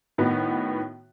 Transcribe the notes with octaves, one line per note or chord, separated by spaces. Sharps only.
A2 D#3 B3 F#4